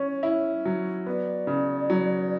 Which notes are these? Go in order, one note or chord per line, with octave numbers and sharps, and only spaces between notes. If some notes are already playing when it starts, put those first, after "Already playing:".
Already playing: C#4 C#5
E4
F#3
B3 D5
C#3
F#3